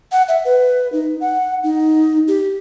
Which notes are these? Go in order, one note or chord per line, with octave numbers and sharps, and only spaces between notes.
F#5
E5
B4
D#4
F#5
D#4
G4